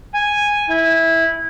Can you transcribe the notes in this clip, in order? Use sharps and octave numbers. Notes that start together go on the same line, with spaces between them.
G#5
E4